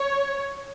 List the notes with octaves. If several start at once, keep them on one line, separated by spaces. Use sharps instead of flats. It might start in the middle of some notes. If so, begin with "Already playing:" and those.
Already playing: C#5